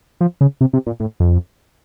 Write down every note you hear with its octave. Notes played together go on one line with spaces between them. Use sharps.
F3
C#3
C3
C3
A#2
A2
F2